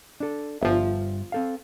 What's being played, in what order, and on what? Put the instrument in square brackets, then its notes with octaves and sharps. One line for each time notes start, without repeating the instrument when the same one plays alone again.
[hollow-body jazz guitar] D4 A4
[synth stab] G1 F3 [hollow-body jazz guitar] G2 E5
[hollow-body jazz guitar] C4 A4 F5